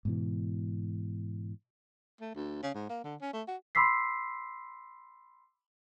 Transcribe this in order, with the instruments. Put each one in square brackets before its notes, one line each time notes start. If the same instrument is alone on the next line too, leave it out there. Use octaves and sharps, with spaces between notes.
[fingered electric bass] G#2 B2 E3
[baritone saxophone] A3
D2
C#3
G#2
A#3
D3
C#4
A3
F#4
[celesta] B5 C6 D6 E6 B6 C7